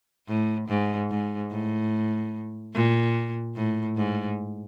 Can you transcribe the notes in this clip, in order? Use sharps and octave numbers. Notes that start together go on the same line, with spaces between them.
A2
G#2
G#2
A2
A#2
A2
G#2